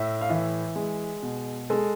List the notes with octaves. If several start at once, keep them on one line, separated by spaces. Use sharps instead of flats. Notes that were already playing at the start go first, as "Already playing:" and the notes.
Already playing: A2 E5
F5
E3 E5
G#3
B2
G#3 A4